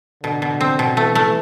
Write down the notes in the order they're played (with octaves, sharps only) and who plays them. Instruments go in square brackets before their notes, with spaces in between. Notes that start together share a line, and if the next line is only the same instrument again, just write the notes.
[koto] B2 [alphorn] D3
[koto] B2
C4
B2
[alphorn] E3 [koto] A3
[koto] A3